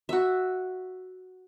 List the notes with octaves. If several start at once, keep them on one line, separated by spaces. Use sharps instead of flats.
F#4 E5